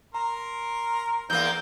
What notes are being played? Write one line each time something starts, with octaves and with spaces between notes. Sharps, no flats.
A#4 A#5 C6
E2 A#3 G6